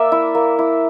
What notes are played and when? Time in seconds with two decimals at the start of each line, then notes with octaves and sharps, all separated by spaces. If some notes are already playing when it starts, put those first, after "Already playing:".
Already playing: A#3 D5 E5
0.12 E4
0.35 A#3
0.59 E4